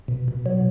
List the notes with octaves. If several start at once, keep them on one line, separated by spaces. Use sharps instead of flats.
B2
B2
F#3